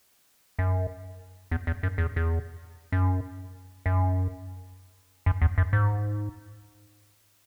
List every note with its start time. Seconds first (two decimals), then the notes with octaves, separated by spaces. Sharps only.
0.59 F#2
1.51 E2
1.67 E2
1.83 F#2
1.98 E2
2.16 E2
2.92 F#2
3.86 F#2
5.26 F#2
5.41 E2
5.58 F#2
5.73 G#2